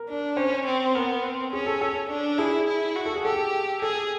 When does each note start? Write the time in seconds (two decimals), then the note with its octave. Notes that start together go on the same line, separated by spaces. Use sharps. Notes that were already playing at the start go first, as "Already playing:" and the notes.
Already playing: A#4
0.09 D4
0.37 C#4 C5
0.66 C4
0.95 B3 A#4
1.23 C4
1.53 C#4 G#4
1.66 A4
1.81 A4
2.10 D4
2.38 E4 G#4
2.67 E4
2.96 F#4
3.06 A4
3.16 G#4
3.25 G4 A4
3.82 G#4 A4